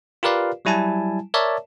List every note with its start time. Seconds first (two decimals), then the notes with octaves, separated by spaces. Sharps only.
0.23 F4 G4 A#4 B4 D5 F5
0.65 F#3 G3 E4 G#5 A5
1.34 A#4 C#5 D5 E5 A5